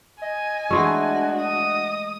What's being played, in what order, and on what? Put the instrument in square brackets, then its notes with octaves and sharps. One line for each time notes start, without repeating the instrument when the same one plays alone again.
[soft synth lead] D#5 [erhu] G#5
[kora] E3 G#3 A3 [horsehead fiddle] D4 F#4
[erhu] D#6